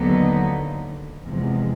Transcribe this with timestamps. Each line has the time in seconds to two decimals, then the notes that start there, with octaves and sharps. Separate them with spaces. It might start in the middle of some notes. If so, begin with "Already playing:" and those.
Already playing: D#2 D3 F#3 B3 D#4
1.23 E2 C3 F3 G#3